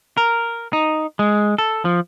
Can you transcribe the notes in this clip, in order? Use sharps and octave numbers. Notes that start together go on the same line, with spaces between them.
A#4
D#4
G#3
A4
F3